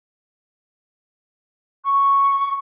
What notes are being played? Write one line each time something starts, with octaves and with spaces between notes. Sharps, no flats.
C#6